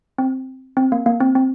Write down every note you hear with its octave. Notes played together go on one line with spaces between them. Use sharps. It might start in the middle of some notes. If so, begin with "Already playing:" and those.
C4
C4
A#3
A#3
C4
C4